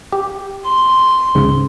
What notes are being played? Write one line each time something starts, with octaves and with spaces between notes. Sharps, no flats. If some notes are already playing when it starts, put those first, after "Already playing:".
G4
C6
C#2 G#2 C#3